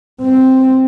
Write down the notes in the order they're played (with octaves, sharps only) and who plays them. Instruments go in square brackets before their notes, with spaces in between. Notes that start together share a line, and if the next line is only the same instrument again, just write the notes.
[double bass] C4